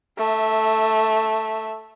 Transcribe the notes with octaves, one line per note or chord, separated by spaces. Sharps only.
A3 E5